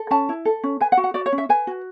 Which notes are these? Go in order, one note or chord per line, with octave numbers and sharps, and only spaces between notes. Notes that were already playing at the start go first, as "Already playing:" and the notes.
Already playing: A4
C#4 A5
E4
A4
C#4
B4 G#5
F#5
F#4
F#5
F#4 D5
C#5
C#4
E5
B4 G#5
F#4